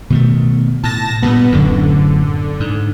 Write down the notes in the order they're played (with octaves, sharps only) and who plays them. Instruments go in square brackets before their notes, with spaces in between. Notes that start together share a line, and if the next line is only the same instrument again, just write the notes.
[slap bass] B2 D#3 A3
[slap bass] A2 [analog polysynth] A5 A#6
[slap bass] G2 A#2 [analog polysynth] B3
[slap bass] D1 F#2 A2 [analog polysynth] D3
[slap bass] G#2